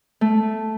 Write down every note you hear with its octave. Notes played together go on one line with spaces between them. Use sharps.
A3